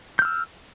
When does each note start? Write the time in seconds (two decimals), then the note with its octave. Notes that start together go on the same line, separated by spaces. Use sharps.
0.19 G6
0.22 F6
0.25 E6